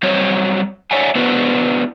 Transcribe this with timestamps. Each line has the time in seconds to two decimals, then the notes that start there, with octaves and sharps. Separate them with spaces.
0.03 F#3 G3 C4 F#4 C5 C#5
0.91 C#5 D5 E5 F#5 G#5
1.15 B3 D4 E4 F#4 B4 C5